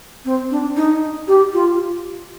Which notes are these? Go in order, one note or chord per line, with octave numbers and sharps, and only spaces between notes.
C4
D4
D#4
G4
F4